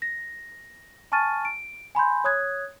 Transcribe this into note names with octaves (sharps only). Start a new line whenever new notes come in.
A#6
G#5 A5 C#6 F6 A6 D#7
D7
G#5 B5 C6 G6
C#5 D#6 F#6 G#6